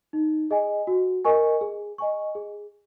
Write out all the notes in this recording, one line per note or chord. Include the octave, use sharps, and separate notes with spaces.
D#4
G#4 D#5 G#5
F#4
A#4 D#5 G#5 C#6
G#4
D#5 G#5 C#6
G#4